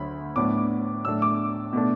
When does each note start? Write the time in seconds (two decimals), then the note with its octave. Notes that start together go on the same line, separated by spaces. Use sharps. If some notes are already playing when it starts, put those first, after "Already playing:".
Already playing: D2 D3 F#3 B5
0.36 A2 F#3 B3 D4 D6
1.05 A2 F#3 A3 D4 E6
1.22 D6
1.73 B2 A3 D4